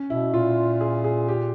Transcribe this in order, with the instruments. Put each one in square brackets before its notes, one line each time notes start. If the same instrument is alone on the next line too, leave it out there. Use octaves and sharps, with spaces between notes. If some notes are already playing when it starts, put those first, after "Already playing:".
Already playing: [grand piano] C#4
[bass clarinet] B2 [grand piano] E4
[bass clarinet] A#2 [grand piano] F4
[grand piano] G#4
G#4
G4